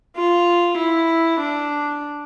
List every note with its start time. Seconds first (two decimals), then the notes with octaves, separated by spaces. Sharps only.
0.17 F4
0.78 E4
1.40 D4